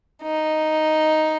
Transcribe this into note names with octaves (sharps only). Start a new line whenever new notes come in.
D#4